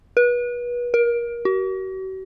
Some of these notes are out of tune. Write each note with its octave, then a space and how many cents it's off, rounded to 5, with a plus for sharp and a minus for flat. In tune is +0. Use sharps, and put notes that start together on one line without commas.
B4 -30
A#4 +25
F#4 +45